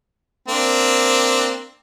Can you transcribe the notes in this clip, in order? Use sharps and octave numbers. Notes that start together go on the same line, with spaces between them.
A#3 C4 D4